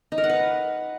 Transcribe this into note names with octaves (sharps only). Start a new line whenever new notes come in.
D#4
A#4
F#5
B4